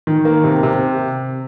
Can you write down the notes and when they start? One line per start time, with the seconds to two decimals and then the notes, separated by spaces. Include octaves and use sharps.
0.07 D#3
0.25 A#3
0.44 C3
0.63 C3